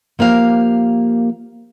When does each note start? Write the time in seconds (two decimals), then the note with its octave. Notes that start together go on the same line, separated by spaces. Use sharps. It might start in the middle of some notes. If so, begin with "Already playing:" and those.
0.19 F3 A#3 G4 F5